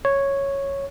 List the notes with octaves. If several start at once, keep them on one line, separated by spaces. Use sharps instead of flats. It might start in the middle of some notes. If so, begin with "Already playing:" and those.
C#5